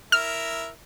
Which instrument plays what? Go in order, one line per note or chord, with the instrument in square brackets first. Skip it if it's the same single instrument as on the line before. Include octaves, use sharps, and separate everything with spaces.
[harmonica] E4 A#4 E5 [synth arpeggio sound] F6